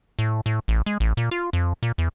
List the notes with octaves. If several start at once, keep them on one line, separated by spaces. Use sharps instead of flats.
A2
A2
A1
G#3
A1
A#2
F4
F2
A#2
E2